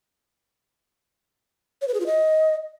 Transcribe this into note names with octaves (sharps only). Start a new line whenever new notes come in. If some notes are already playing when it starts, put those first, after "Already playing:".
C#5
B4
G#4
F4
D#5